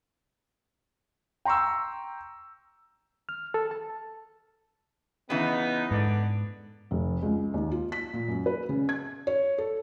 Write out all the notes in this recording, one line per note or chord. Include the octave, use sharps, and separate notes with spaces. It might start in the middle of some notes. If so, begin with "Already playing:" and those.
G5 A#5 C6 C#6 E6
F6
A4
A5
C#3 E3 B3 D#4
G#2 D3 B3 D5
F1
C#2
D#2
F4
B6
A#2
F#2
B4
C#3
G#6
C#5
A4